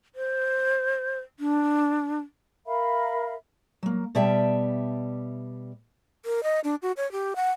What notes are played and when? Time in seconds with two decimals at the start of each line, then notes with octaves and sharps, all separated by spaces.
0.15 C5
1.40 D4
2.65 A#4 E5 F5 B5
3.83 F#3 A#3
4.15 B2 G3 D5 E5 G5 A5
6.25 A#4
6.43 D#5
6.64 D4
6.82 F#4
6.97 C#5
7.12 G4
7.36 F#5